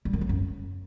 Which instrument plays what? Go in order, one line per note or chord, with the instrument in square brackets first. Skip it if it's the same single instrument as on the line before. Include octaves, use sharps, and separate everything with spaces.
[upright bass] G3
D#3
F#3
F#2